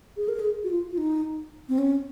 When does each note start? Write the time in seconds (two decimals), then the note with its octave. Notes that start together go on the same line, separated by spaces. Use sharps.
0.17 G#4
0.28 A#4
0.39 G#4
0.64 F#4
0.71 F4
0.91 F4
0.98 D#4
1.69 C4
1.78 C#4